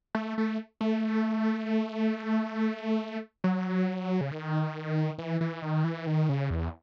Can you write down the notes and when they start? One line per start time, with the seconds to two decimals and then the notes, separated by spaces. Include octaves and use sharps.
0.15 A3
0.38 A3
0.81 A3
3.44 F#3
4.21 C#3
4.32 D#3
5.18 E3
5.41 E3
5.62 D#3
5.84 E3
6.07 D#3
6.29 C#3
6.50 E2